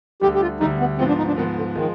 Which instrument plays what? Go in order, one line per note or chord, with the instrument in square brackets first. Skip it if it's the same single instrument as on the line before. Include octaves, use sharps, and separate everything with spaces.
[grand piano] D2 D3 G3 [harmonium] G4
[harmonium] G4
F4
[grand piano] D2 D3 G3 [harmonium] D#4
[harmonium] B3
[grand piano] G#2 F3 B3 [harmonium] C4
[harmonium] D4
D#4
D4
[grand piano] G#2 F3 B3 [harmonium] D#3
[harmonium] D3
[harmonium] D#3 [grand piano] F3 G#3